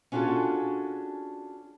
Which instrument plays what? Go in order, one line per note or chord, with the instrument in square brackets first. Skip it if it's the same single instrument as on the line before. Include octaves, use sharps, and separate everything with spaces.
[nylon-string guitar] C#4 D4 F4 F#4 G#4 A4